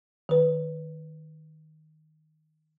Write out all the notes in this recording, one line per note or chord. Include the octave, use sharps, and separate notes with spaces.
D#3 B4